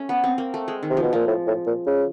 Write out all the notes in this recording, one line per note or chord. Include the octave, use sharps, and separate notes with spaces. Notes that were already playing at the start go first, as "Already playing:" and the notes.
Already playing: A3 C#4
B3
C4
A#3
A3
G#3
D#3
C3
B2 F3
A#2 F3
A2
A2
A#2
C#3